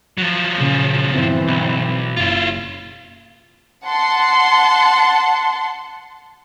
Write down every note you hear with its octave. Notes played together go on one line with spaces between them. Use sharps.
F3 F#3
A#2 C#3
G1 E3 C4
B1
F#1 E4 F4
F#5 A5 C6